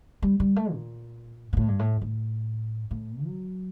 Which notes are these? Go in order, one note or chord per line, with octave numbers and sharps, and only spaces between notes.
G3
G3
A3
A#2
A#2
A2
G2
A2
A2
A2
F#3